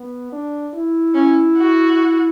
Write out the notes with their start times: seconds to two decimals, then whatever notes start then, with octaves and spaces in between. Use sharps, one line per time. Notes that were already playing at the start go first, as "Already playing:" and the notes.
Already playing: B3
0.32 D4
0.74 E4
1.14 C#4
1.57 F#4